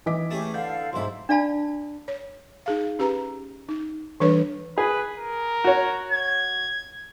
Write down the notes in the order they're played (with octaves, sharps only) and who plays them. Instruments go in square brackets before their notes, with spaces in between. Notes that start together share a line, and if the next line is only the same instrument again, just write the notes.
[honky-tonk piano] E3 [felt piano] D#5 D6 B6
[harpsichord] A3 G#4 [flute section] C#4 G4
[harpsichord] D3 [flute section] A4 F5 [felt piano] G6
[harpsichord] B1 E4 [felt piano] G#2 C5 [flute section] E5 C6
[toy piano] D4 D5 F5 A5 B5
[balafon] C#5
D#4 G#4 F5
C#4 G4 B4 A#5
D#4
E3 G3 D4 A4 B4 C#5
[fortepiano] G#4 [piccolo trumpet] B4
[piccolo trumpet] A#4
[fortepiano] F#4 C#5
[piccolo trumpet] G#6